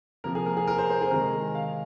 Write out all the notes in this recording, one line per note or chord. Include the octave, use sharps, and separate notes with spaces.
C3 F3 A#3 A#4
G#4
A#4
G#4
A#4
C5
C5
G#4
C3 D#3 G#3 A#4
F5